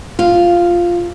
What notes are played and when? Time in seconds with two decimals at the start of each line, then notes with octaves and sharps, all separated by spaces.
0.19 F4